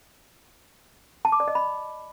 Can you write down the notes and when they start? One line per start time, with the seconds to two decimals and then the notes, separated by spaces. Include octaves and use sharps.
1.25 A5
1.32 D6
1.40 D5
1.48 D#5
1.55 B5